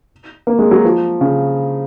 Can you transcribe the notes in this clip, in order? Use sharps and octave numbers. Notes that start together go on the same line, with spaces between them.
A#3
G#3
F#3
F3
C#3